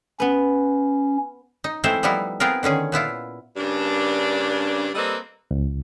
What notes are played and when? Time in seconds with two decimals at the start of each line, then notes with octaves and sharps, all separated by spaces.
0.20 B3 C#4 B4
1.64 D#4
1.84 E3 G#3 A3 C4 E4 C5
2.03 F3 G3 B3 D#4 E4
2.40 B3 C4 F4 G#4 A#4
2.63 D3 D#3 C#4 G#4
2.92 A#2 B3 E4 F4
3.57 G2 C#3 A#3 D4
4.95 G3 A#3 C4 A4 B4 D#5
5.51 C#2